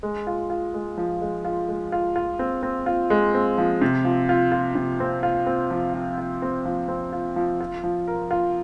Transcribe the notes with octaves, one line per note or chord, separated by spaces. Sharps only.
G#3
F4
F4
G#3
F3
G#3
F4
G#3
F4
F4
C4
C4
F4
G#3
C4
F3
C3
F3
F4
F4
C3
C4
F4
C4
F3
F3
F4
C4
F3
C4
F4
F3
F4
F3
A#4
F4